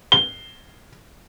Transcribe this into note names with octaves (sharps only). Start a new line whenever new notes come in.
G7